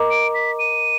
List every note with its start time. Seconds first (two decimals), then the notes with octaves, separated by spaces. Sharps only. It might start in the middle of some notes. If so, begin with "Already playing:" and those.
Already playing: A#4 D#5 A#5 D6
0.11 D7
0.35 B6
0.59 D#7